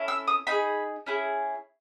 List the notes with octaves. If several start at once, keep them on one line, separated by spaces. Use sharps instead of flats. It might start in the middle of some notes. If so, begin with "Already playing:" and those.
Already playing: C#4 E4 A4
E6
D#6
D#4 G#4 B5
C#4 E4 G#4